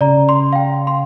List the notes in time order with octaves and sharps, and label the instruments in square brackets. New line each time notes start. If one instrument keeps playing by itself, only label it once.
[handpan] C#3 [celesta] D5 A#5
[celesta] C6
F5 G5
C6